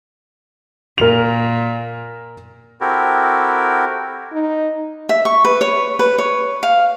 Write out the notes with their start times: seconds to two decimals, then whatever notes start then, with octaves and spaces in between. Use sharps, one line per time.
0.98 A#2 A#4 F7
2.81 C4 E4 F#4 G4 A4 A#4
4.33 D#4
5.09 E5
5.25 C#6
5.45 B4
5.61 C#5
5.99 B4
6.19 C#5
6.63 F5